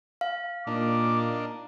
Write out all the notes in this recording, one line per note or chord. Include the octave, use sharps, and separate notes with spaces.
F5
A#2 A#3 D4 D#4 D6